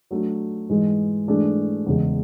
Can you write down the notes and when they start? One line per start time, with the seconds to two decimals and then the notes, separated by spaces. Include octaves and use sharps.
0.11 F#3 A3 D4
0.70 G#2 E3 G#3
1.28 G#2 E3 A3 D4 G#4
1.86 E2 C#3 G#3